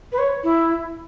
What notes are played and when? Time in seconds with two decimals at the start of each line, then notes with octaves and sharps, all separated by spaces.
0.12 B4
0.18 C#5
0.43 E4